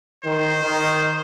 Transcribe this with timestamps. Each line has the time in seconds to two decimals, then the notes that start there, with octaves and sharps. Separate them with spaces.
0.24 D#3 C5
0.61 D#3